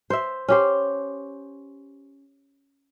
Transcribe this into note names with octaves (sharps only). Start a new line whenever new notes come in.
C5 E5
C#4 G4 C5